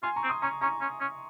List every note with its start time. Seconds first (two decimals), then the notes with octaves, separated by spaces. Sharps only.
0.03 F4 G#5 C6
0.16 A#5 C#6
0.23 C4
0.29 C6 D#6
0.42 C#4 A#5 C#6
0.61 C#4 A#5 C#6
0.81 C#4
1.00 C#4